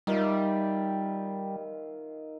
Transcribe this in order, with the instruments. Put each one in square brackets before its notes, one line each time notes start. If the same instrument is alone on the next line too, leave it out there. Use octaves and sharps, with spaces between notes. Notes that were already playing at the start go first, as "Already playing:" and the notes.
[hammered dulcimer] D#3 F4 E5 [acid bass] G3